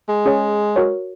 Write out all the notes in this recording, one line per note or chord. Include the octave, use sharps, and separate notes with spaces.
G#3
C#4 G#4 C#5 G#5
F#4 A#4 C#5